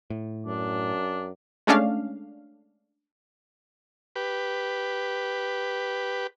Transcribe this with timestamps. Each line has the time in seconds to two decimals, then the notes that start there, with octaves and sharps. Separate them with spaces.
0.10 A2
0.46 F#2 D4
1.67 G#3 A3 C#4 D4 F5
4.16 G4 B4